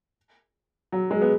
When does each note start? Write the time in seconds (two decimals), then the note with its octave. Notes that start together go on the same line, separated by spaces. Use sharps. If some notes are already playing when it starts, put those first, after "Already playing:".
0.92 F#3
1.11 G#3
1.21 B3